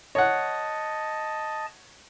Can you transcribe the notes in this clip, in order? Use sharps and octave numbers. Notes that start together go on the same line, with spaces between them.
C#5 D#5 F#5 A5